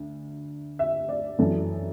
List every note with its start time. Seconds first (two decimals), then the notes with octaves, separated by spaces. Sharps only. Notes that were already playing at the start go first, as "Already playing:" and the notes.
Already playing: D2
0.79 E5
1.09 D5
1.39 F#2 E3 A4